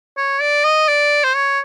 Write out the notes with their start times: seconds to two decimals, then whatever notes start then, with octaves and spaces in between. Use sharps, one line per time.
0.17 C#5
0.40 D5
0.64 D#5
0.88 D5
1.24 C5
1.35 C#5